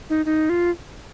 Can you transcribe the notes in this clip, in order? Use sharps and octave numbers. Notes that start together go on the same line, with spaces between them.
D#4
D#4
F4